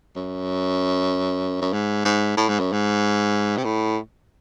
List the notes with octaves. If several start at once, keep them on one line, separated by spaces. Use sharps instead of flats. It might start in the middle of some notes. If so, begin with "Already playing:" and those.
F#2
F#2
G#2
G#2
A2
G#2
F#2
G#2
C3
A2